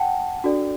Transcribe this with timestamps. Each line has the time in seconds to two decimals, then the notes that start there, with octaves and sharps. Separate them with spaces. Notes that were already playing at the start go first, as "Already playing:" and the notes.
Already playing: F#5 G5 A5
0.44 D4 F#4 A4 D5